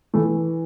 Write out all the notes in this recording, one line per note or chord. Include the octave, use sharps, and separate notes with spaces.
E3 A3